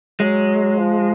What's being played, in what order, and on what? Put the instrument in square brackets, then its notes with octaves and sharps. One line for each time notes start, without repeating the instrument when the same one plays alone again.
[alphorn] F#3 [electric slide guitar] G#3
[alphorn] F3